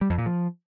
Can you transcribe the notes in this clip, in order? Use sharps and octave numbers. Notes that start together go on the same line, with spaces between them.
G3
F2
A#2
F3